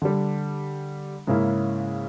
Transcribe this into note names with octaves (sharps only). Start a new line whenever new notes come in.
D3 G3
G#2 C#3 A#3 C#4 E4